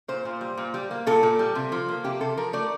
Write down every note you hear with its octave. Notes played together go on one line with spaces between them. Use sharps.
A#2 C5
A#2
G3
A#2
G3
A#3
A#2 A4
A#2
G3
C3
F3
A#3
C3 G4
C3 A4
F3 A#4
A3 D5